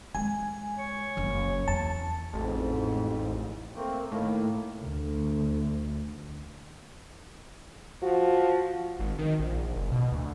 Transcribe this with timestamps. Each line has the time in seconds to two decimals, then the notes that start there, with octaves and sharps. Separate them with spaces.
0.15 G#3 G#5
0.79 C#5
1.17 F#1 A#3
1.68 E2 A5
2.33 A1 F2 G#2
3.75 A3 A#3 C4
4.12 A2 D#3 A#3
4.85 D2
8.02 F3 F#4
8.99 G#1
9.18 D#3
9.39 A#1
9.76 F#1
9.92 B2
10.12 D2